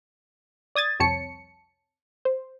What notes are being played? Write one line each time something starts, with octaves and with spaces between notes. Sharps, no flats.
D5 D#6 G#6 A6
C2 F2 C4 C#5 A5 C#7
C5